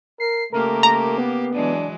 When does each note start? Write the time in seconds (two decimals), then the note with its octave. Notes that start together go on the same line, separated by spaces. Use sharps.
0.20 A#4 C7
0.53 C#3 A3 A#3 G4 A#4
0.83 A#5
1.18 B3
1.55 E3 F#3 G#3 D4